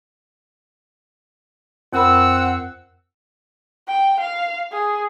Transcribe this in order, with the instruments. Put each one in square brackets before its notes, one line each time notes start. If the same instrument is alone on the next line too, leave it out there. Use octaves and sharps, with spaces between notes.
[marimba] F2 A#4 B5 [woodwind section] C4 F#5 E6
[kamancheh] G5
F5
G#4